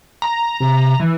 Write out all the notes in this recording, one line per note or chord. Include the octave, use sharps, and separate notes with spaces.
A#5
C3
E3